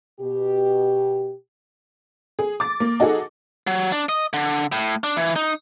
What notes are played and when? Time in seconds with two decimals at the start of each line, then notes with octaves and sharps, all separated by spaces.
0.21 B2 G4
2.39 G#4
2.60 D6 A6
2.80 A#3
3.00 D#4 F#4 G#4 A4
3.67 F#3
3.92 D4
4.09 D#5
4.33 D3
4.72 A2
5.04 D4
5.17 E3
5.36 D#4